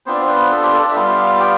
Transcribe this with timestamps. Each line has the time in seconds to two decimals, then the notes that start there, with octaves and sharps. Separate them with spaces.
0.06 B3 C4 D4 F4 C5
0.14 D5
0.21 C5
0.29 B3 B4
0.51 A4
0.62 G4
0.73 A4
0.84 D4 D5
0.91 E5
0.95 G3 B3 F4 F5
1.35 F5
1.40 G4 G5